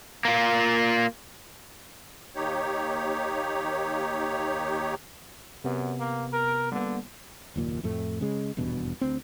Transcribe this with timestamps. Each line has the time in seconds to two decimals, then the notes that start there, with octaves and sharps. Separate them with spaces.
0.25 A#3 F4
2.36 D#2 D#4 G4 C#5
5.64 F#2 C3 B3
5.99 A#3
6.33 A#4
6.72 D3 G3 A#3 B3
7.56 F#1 D#2 A#2
7.83 F2 A2 A3
8.21 C#3 G#3
8.57 D#1 E2 G2 B2
9.01 D2 C4